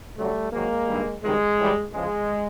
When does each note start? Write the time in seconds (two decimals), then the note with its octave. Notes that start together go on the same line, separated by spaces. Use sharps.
0.17 D2 C#3 F#3 G3 A3
0.52 G#2 D#3 F#3 G#3 A#3
0.87 G2 D#3 G3
1.23 C#2 C3 D#3 G3 G#3
1.58 A2 E3 G3
1.93 E2 C#3 F3 G#3